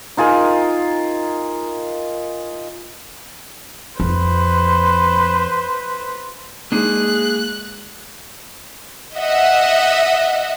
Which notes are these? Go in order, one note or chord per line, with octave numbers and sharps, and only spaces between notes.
D#4 F4 G#4 A#4
F2 B4 C5
G#3 A#3 D#4 G#4 F#6
D#5 E5 F#5